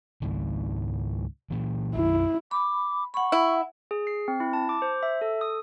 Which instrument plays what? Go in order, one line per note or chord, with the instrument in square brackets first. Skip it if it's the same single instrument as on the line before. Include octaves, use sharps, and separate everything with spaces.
[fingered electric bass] C#2 G#2 D#3
A#2 E3
[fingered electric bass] B1 F#2 D#3 [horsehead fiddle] E4
[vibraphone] B5 [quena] D6
[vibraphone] F#5 B5 [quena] C#6
[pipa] E4
[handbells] G#4
C7
C4
E4
A5
D6
C5
E5
A4
D#6